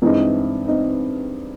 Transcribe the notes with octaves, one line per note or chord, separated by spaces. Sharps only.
G2 E3 G#3 C4 D#4
C4 D#4